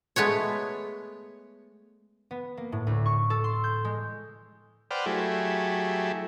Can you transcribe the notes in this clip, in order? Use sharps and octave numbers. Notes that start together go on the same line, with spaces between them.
G#3 A3 B3 C#5
B3
A#3
A2
D2
C#6
A4
C6
G6
G#3
B4 C5 D5 F#5 G5 F6
F#3 A3 E4 G4 G#4